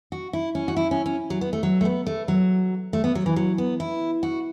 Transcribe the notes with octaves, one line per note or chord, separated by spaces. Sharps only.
F#4
E4
C#4
F#4
E4
C#4
C#4
F#3
B3
A3
F#3
A3
B3
A3
F#3
A3
B3
F#3
E3
F#3
B3
E4
F#4